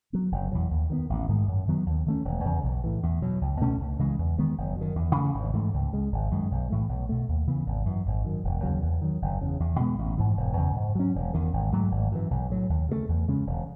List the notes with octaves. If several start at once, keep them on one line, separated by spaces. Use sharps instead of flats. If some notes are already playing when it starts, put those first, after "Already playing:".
F#3 B3
F#1
E2 B2 F#3
D#2
D#3 G#3 B3
A1
G#2 D#3 G#3
F#2
D#3 F#3 B3
D#2
D#3 A3 C#4
E1
E2 C#3
B1
A2 E3
E2
B2 F#3
C#2
B2 A3 C#4
C#2
C#3 E3 G#3
E2
D#3 G#3 B3
F#1
F#2 D#3
E2
C#3 E3 A3
G#1
G#2 E3 A3
C#2
C#3 G#3
G#1
F#2 D#3 G#3
B1
A2 E3 A3
B1
B2 A3
D#2
C#3 E3 B3
G#1
F#2 E3
G#1
F#2 D#3
E1
D#2 C#3 F#3
E2
D#3 F#3
F#1
E2 C#3
E2
B2 G#3 B3
A1
G#2 E3
E1
E2 C#3
G#2
F#3 C#4
E1
E2 D#3
G#1
G#2 F#3 A3
G#1
F#2 E3
B1
A2 F#3
D#2
C#3 F#3 A3
E2
C#3 G#3 C#4
E1